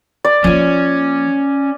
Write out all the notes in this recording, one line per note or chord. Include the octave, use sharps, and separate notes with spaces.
D5
F3 A#3 C#4